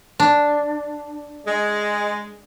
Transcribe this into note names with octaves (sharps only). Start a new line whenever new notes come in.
D4
G#3